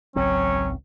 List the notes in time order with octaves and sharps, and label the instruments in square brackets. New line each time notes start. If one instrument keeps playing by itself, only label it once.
[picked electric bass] G#1 C#2 C4 [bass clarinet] F#3 [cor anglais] C#4